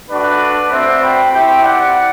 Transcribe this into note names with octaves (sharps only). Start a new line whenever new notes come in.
A3 D4 F#4 B4 D5
A3 C4 F#4 C5 E5
G5 B5
C4 E4 G4 E5 G5
D5 F#5